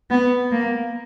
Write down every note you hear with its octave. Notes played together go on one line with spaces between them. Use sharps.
B3
A#3